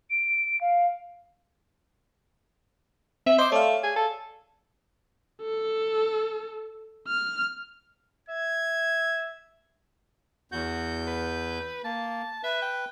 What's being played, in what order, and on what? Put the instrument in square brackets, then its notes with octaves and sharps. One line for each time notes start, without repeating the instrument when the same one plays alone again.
[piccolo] D7
F5
[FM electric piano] C4 [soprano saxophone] E5
[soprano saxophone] C5 [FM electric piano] D#5 C6 D6
[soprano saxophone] A3 [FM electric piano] C#5 D5 F5
[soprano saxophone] G#4
A4
[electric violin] A4
F6
[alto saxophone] E5 [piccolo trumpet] G#6
[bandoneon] E2 G6 [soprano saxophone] F#4
[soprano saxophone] B4
[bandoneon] A#3 [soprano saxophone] A5
[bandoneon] B4 [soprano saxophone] E5
[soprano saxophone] G5